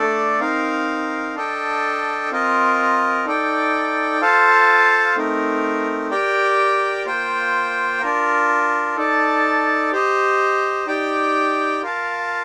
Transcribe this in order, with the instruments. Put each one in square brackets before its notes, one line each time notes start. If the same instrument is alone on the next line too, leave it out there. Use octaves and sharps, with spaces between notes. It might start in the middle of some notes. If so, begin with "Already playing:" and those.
Already playing: [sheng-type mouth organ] A3 D4 A4 D5
C4 D#4 A#4 F5
D4 A4 D#5 G5
C4 F4 A#4 D#5
D#4 A4 D5 G5
F4 A4 C5 F5 A5
A3 C4 D#4 A#4
G4 A#4 D5 G5
A#3 F4 C5 G5
D4 F4 A#4
D#4 A4 D5 A5
G4 C5 D#5
D#4 G4 D5 G5
F4 A#4 F5 A5